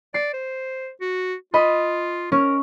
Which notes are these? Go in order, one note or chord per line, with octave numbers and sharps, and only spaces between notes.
D5 C7
C5
F#4
F4 D#5 B5
C#4 A#4